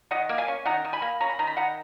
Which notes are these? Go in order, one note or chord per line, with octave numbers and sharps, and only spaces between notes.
D#3 D#5 F#5
A#3
F5 G#5
C#4
D#3 F#5 A#5
D#3
G#5 B5
A#3
C#4 A#5
B5
D#3 A#5
B5
D#3 F#5 A#5